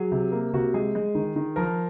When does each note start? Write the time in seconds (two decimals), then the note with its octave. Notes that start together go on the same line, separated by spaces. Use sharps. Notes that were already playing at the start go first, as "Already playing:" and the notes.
Already playing: F#3 G#4
0.12 C3
0.32 A#3
0.53 C3 F#4
0.74 G#3 G#4
0.95 G#3
1.15 D#3
1.36 D#3
1.56 F3 A#4